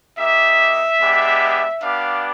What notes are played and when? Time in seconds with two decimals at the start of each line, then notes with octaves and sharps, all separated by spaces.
0.18 A#3 D#4 G4 E5
1.00 G#3 B3 D4 G4
1.82 B3 D4 G4 F5